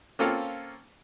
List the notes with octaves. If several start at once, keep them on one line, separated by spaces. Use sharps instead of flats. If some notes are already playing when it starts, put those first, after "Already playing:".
A#3 C4 C#4 F4 A4